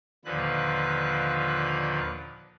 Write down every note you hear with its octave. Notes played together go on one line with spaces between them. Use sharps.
D#2 A#2 D3 F3 B4 F#6